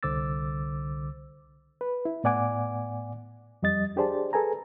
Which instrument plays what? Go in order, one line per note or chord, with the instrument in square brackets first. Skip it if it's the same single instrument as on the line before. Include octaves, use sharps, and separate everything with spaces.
[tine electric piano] C2 D3 C5 D6 E6 A6
[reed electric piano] B4
E4
A2 B3 D5 F#5 G#5 D6
F2 G3 D#5 A6
D4 G4 G#4 C5 D5 A5
G#4 A4 B4 G#5 A#5